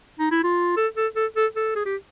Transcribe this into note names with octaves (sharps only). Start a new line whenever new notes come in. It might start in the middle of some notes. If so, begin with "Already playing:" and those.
D#4
E4
F4
A4
A4
A4
A4
A4
G#4
G4